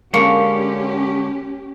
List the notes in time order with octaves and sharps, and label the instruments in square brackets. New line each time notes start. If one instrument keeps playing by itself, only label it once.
[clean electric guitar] D3 G#3 C#5 [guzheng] A#3 [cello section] C#4 G4